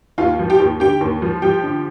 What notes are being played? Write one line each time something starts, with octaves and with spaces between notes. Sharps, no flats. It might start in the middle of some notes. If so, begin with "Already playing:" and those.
D#2 F4 F5
F3
G4 G5
D#2
D3 G4 G5
D#2
F3
F3 G4 G5
D3